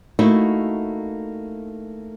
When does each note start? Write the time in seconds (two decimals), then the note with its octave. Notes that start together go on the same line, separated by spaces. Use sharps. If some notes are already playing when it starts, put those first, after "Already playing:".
0.19 A3 A#3 D#4 E4 F#4